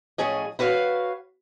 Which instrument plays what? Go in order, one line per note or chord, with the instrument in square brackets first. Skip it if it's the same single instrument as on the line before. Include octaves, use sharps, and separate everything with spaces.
[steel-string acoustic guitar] A2 F3 C#4 G#4 D#5
E4 F#4 B4 C#5 F5